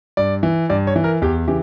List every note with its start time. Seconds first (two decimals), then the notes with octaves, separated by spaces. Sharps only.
0.17 G2 D5
0.43 E3
0.70 G2 D5
0.87 C#5
0.96 E3
1.04 A#4
1.22 E2 G4
1.47 C#3 E3 G4